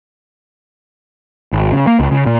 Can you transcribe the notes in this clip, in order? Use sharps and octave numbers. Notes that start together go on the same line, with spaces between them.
G#1
C#3
A#3
C#2
C#3
A#2